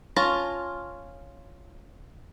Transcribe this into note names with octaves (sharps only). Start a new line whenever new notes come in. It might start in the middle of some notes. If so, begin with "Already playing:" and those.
C#4 F4 A5 A#5